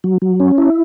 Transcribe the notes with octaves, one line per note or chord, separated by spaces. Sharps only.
F#3
F#3
C#4
E4